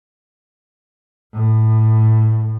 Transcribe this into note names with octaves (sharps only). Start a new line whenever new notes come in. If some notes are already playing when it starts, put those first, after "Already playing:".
A2